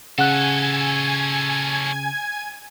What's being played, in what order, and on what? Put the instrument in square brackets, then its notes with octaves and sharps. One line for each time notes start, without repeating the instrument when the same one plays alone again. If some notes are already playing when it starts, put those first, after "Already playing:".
[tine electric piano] C#3 [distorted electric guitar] C#4 A4 [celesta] F#5 F#6 [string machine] G#5 G#6